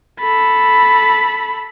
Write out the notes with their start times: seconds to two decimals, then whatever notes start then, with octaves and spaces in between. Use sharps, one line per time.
0.20 A4 B5